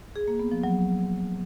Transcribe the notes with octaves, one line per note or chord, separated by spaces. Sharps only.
G#4
A#3
B3
F3
F#3